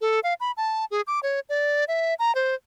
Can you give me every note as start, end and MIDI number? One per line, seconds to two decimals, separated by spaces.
0.01 0.20 69
0.24 0.34 77
0.40 0.52 83
0.57 0.85 81
0.91 1.01 68
1.07 1.20 86
1.23 1.40 73
1.49 1.85 74
1.88 2.14 76
2.19 2.34 82
2.35 2.54 72